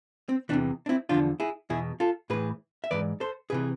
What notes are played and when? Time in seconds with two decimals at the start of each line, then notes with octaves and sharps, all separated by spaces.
0.29 C4
0.49 E2 C3 E3 B3 D4
0.86 D4
0.89 C4 E4
1.09 E2 D3 F3 D4 F4
1.40 E4 G#4
1.70 E2 B2 E4 G#4
2.00 F4 A4
2.30 A2 E3 G#4 B4
2.84 E5
2.91 G#2 E3 B4 D5
3.20 A4 C5
3.50 C3 E3 G#4 B4